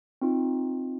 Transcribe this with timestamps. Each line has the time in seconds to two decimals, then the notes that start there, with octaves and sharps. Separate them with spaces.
0.21 C4 D#4 F4